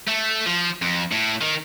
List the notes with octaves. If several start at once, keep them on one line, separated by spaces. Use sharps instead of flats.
A3
F3
F2
A2
D#3